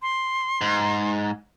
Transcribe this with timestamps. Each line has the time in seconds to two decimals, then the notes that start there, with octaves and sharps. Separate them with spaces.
0.02 C6
0.61 G#2